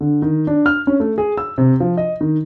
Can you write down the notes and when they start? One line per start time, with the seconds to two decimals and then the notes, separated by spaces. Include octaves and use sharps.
0.01 D3
0.22 D#3
0.47 D4
0.66 F6
0.87 C#4
1.00 A3
1.18 G#4
1.37 E6
1.58 C3
1.80 F3
1.97 D#5
2.21 D#3